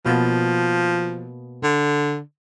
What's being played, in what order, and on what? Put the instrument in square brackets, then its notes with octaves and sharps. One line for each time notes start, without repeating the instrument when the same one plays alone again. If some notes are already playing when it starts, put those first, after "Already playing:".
[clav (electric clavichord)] B2 A#3 B3 [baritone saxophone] F3
[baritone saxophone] D3